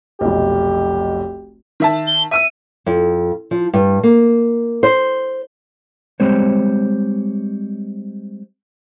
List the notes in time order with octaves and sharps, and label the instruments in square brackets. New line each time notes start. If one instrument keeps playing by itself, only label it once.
[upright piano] F1 B1 [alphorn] G4
[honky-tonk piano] D#3 E5 A5
[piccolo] G7
[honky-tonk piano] E5 E6 [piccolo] D#7
[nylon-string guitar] F2
F3
G2
A#3
C5
[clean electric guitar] G3 G#3 C4 C5 C#5